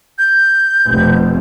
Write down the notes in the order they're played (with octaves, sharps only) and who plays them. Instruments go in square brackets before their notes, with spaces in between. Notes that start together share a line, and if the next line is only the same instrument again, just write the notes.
[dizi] G6
[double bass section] F1 B2